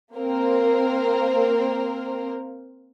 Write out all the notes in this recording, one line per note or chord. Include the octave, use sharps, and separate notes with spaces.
A#3 C4 A#4